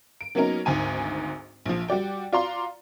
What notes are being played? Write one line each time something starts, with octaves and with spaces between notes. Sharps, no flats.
D7
F#3 A#3 B3 C#4 D#4 A#4
G#1 D2 G#2 G#5 D#7
A#1 F3
G3 F#4 D5 G5
F4 F#4 D5 F5 A#5 C6